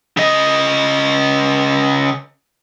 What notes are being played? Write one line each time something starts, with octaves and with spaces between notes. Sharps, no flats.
C#3 D#5